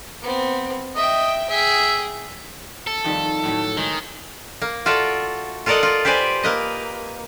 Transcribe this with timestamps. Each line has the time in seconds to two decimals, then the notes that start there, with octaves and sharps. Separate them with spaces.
0.22 B3 C4
0.96 D#5 E5 G5
1.50 G#4 E5 G5
2.87 A4
3.04 F2 D#3 G3
3.43 A2 F#3 A3
3.77 D#3 G#3
4.62 A#3
4.86 F4 F#4 A4 D5 E5
5.66 F4 A4 A#4 D5 D#5 F#5
5.83 F4
6.05 G4 B4 C5 D5 G#5
6.43 A#3 B4 D#5